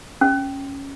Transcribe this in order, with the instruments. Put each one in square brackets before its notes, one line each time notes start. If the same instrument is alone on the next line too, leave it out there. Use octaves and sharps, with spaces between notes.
[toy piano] C#4